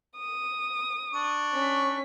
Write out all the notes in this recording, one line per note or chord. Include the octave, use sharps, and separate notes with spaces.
D#6
D4 C#6
C#4 B6